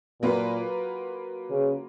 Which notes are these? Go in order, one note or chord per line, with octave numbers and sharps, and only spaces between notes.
A#2 F#3 A#3 F4 B4
C#3